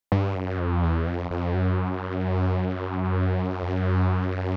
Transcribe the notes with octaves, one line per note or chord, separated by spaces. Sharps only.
G2
F#2
F2
E2
F2
F2
F#2
F2
F#2